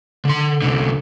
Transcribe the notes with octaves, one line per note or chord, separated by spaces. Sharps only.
D3 C6
C2 D3